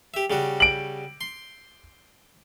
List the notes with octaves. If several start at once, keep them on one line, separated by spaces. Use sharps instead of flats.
G4 E5
C#3 G3 F#4
D7 F#7
C6